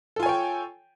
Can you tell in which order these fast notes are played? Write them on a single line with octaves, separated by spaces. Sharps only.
A4 F4 G#5 C#5 G5